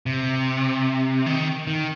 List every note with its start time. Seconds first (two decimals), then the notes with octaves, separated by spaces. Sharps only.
0.06 C3
1.26 D#3
1.67 D#3